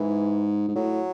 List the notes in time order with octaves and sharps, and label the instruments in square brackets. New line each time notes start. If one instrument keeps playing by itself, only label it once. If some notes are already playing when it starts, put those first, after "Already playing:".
Already playing: [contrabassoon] G#2 [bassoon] E3
[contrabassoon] G#2
[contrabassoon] A2 [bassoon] F#3